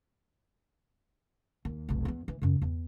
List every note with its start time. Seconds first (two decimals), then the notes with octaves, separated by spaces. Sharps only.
1.65 D#2
1.89 F1 B1
2.05 E2 B3
2.28 E3
2.42 F#2 C#3
2.62 E2